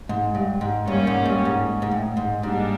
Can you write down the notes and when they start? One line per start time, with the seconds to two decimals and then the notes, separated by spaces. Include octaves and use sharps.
0.09 G#2
0.35 G2
0.61 G#2
0.88 G2 G3 A#3 C#4
1.07 G#2
1.26 G2
1.45 G#2
1.82 G#2
1.91 A2
2.17 G#2
2.43 G#2 G3 A#3 D4